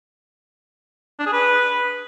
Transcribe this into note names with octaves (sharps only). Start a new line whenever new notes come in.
D4
G#4
B4